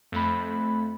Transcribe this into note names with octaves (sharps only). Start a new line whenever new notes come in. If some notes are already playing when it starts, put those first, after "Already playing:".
F2 A3 B5